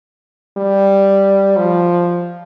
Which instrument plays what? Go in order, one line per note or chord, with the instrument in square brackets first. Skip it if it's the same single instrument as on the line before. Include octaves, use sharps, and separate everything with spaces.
[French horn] G3
F3